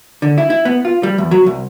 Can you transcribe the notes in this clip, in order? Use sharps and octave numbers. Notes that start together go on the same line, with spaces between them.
D3
E4
E4
B3
F4
G3
E2
F#3
C2